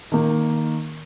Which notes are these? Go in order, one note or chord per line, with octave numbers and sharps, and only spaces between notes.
D#3 A#3 D#4